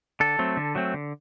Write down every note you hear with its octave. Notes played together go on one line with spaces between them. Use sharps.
D3 A4
F#3 A3 C4
D3
F#3 A3 C4
D3